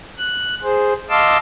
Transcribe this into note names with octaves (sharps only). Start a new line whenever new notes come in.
F#6
G#4 C5
D#5 F5 A5 C6 D6 E6